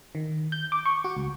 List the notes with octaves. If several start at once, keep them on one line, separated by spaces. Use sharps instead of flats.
D#3
G6
D6
C#6
F#4
C#2